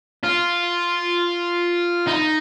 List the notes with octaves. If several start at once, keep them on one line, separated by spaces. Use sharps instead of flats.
F4
D#4